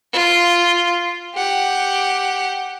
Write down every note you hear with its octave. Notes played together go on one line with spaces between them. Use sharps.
F4
G4 F#5